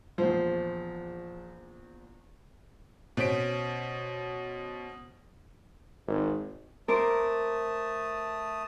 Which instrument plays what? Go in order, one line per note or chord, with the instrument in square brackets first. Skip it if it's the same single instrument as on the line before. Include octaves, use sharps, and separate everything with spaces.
[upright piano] A#1 E2 [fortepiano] F3 [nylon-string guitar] C5
[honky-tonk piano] B2 C#4 C5 B6 D7
[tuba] G#1
[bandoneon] A3 A5 D#6 [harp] A#4 C5 D6